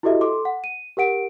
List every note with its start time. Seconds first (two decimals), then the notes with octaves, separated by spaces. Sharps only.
0.03 E4 F#4 G4 A4 D#5 E5
0.21 A4 C6 D6
0.45 F#5
0.64 D#7
0.97 G4 A#4 F#5 D7